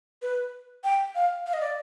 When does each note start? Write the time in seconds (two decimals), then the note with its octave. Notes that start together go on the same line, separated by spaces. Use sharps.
0.22 B4
0.84 G5
1.15 F5
1.46 F5
1.53 D#5
1.61 D5